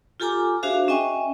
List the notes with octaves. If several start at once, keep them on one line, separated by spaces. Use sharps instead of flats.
F4 G4 A4 G#5 A#5 D6
D4 F#4 G#4 C5 E5 F5
C#4 D#5 E5 G5 G#5 C#6